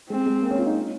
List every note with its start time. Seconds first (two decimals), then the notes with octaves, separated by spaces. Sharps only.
0.10 G#3 C4
0.26 G#3
0.42 A#3
0.51 C#4
0.59 F4
0.67 D#4
0.74 C#4